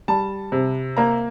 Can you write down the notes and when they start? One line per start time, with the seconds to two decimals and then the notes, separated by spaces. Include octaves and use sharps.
0.08 G3 A5
0.52 C3
0.97 A#3 A#5